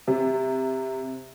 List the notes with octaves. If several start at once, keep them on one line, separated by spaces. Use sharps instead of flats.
C3